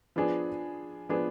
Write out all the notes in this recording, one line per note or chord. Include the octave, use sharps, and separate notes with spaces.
F3 B3 D4 G#4
F3 B3 D4 G#4